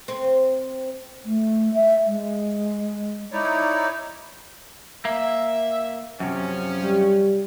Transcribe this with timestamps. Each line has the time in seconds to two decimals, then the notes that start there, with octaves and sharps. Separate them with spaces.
0.08 C4
1.25 A3
1.74 E5
2.06 G#3
3.31 D#4 E4 C#5 D5
5.05 A#3 E5
6.20 F#2 C3 F3 C#4
6.83 G3